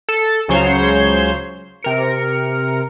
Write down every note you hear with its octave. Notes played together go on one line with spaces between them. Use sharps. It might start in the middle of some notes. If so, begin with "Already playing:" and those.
A4
C#2 C#3 F#3 C5 C#5 C6
C3 A#4 C#7